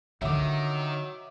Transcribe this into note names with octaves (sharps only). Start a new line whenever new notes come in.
D3 D#3 F#3 F4 E5 D6